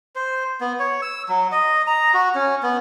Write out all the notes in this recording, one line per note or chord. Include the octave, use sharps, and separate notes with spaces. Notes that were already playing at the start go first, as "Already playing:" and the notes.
C5
B3
C#5
E6
F#3
D#5
A#5
F#4
C#4
B3